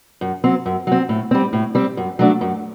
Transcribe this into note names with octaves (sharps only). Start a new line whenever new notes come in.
F#2
F#3 C4
F#2
F#3 C4
A2
G3 C4
A2
G3 C4
F#2
F#3 A3 D4
F#2